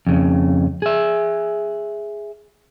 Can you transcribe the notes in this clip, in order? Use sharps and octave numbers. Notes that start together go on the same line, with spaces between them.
F2 C#3
G#4 E5